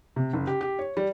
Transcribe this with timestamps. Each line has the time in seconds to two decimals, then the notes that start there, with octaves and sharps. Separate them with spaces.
0.16 C3
0.33 F#1
0.47 G4
0.61 G4
0.79 C#5
0.97 G3